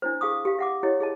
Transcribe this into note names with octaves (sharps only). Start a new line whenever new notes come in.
D4 E4 C5
G#4 F5 C#6 D#6
G4 F5
E5 F#5 D6
E4 G4 C#5 D#5
G#4 D#5 A5